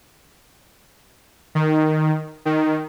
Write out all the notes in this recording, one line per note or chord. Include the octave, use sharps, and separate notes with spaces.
D#3
D#3